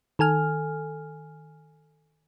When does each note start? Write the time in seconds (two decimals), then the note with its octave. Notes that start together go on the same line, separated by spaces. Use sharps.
0.19 D#3 A4 G#5 F6